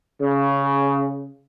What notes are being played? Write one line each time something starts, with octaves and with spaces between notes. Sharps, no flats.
C#3